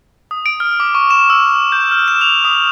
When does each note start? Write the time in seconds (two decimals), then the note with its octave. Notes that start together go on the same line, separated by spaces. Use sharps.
0.31 D#6
0.46 D7
0.60 F6
0.80 D6
0.95 C#6
1.11 E7
1.30 E6
1.72 G6
1.91 F6
2.08 E7
2.21 F7
2.45 D#6